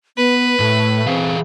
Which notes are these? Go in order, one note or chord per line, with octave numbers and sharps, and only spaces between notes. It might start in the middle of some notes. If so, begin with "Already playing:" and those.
B3 B4
A2 A3
E3 C4 G#4 F5